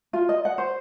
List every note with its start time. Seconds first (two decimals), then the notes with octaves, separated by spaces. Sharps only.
0.13 F4
0.29 D#5
0.45 F#5
0.58 C5